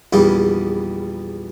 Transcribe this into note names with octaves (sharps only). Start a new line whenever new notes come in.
A#1 E2 G3 G4